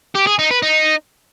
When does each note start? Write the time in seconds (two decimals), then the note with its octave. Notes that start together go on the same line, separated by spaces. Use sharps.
0.15 G4
0.27 G#4
0.39 D#4
0.51 B4
0.62 D#4